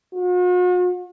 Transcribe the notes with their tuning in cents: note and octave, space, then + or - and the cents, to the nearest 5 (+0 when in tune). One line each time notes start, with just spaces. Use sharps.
F#4 -45